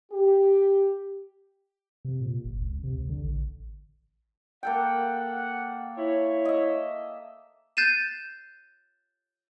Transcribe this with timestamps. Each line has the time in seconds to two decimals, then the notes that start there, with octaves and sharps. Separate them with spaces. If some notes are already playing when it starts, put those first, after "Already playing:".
0.11 G4
2.05 C3
2.21 A#2
2.45 F#1
2.61 C#2
2.84 C3
2.98 C#2
3.09 D3
3.24 A1
4.63 A#3 A4 F#5 G5
5.97 E4 C#5
6.45 D#5 E5
7.77 F#6 G6 A6 C7 D#7 E7